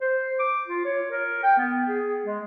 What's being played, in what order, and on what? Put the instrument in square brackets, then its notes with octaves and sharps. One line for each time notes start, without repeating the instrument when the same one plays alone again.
[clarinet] C5
D6
F4
C#5
A#4
G5
B3
G#4
G#3